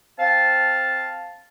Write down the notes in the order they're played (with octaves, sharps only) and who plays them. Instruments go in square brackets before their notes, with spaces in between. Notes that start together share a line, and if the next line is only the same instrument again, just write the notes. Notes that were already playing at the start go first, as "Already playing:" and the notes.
[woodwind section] C4 F5 A5